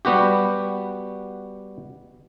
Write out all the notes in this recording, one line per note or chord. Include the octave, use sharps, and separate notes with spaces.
G3 B3 F#4 G4